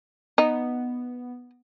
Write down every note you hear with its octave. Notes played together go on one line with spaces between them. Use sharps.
B3 D#4